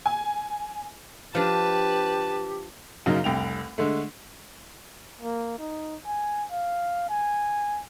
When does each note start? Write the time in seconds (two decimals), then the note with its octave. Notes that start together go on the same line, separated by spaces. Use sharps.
0.06 G#5
1.35 F3 D4 G4 B4 A5
3.06 F#2 C#3 F#3 A#3 D#4
3.24 F1 C2 G5 F7
3.78 D3 G#3 A3
5.21 A#3
5.58 D#4
6.06 G#5
6.52 F5
7.09 G#5